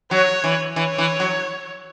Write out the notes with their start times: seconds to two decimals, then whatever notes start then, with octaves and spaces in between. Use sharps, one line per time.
0.11 F#3 C#5
0.44 E3
0.76 E3 C#5
0.98 E3
1.20 F#3